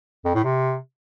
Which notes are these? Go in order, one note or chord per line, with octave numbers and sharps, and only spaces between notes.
F2
A2
C3